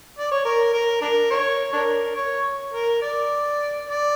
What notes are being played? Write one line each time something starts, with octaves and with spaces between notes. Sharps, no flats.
D5
C#5
A#4
A#4
D4 A#4
A#4 C#5
D4 A#4
C#5
A#4
D5
D5